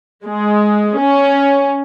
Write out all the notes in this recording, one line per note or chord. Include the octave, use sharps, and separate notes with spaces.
G#3
C#4